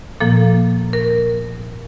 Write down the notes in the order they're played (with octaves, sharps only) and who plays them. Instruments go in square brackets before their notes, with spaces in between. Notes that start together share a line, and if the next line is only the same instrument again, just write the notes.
[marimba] A#2 F3 A#3 A4
A#4